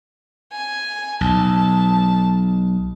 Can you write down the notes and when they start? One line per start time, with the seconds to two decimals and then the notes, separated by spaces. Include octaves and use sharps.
0.52 G#5
1.21 B1 A5